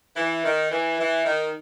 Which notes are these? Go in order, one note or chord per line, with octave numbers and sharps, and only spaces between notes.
E3
D#3
E3
E3
D#3